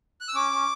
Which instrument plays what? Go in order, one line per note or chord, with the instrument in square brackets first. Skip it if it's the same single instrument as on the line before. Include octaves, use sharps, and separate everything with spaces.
[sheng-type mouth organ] F#6
E6
C#4 D6
C#4